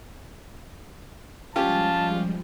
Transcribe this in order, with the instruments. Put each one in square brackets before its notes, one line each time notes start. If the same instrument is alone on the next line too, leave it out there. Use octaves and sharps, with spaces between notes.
[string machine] F3 G3 G#3 [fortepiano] C#4 G4 [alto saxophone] F4 [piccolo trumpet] A5